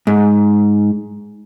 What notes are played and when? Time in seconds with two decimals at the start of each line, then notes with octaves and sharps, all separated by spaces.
0.07 G#2